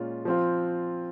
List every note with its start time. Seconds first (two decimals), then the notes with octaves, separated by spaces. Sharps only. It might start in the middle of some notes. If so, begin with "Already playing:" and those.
Already playing: A#2 G#3 C#4 F4
0.25 F3 C4 F4